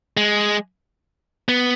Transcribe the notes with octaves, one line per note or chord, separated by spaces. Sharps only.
G#3
B3